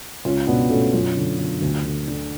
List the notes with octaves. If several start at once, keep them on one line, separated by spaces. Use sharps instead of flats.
C#2 C#4 F4
B2 B3 D4
B2 A3 C#4
F#2 C#4 F4
D3
D3
D2
D3
D3